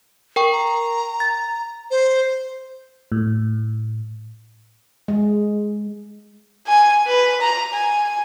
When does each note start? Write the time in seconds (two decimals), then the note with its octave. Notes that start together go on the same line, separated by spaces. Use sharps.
0.36 A#4 G5 C#6
0.52 A#5
1.20 A6
1.91 C5
3.12 A2
5.08 G#3
6.68 G#5
7.07 B4
7.42 A#5
7.73 G#5